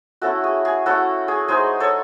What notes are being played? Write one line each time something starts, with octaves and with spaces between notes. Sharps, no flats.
A3 C#4 E4 F#4 A4
G#4
G#4
A3 C#4 E4 F#4 A4
G#4
G#3 D#4 G#4 C5
A4 C#5